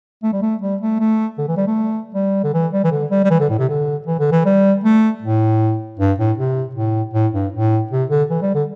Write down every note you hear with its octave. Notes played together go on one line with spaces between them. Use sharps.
A3
G3
A3
G3
A3
A3
D3
E3
G3
A3
G3
D3
E3
G3
E3
D3
G3
G3
E3
D3
A2
C3
D3
E3
D3
E3
G3
A3
A2
G2
A2
C3
A2
A2
G2
A2
C3
D3
E3
G3
D3